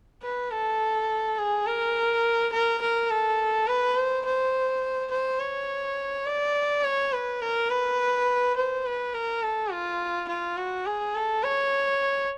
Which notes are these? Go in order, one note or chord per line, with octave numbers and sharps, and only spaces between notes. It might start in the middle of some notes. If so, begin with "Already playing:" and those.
B4
A4
G#4
A#4
A#4
A#4
A4
B4
C5
C5
C5
C#5
D5
C#5
B4
A#4
B4
C5
B4
A#4
A4
F4
F4
F#4
G#4
A4
C#5